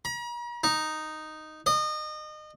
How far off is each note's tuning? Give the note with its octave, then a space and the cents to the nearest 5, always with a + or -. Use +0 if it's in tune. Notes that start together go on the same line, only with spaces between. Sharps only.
A#5 +45
D#4 -5
D#5 -30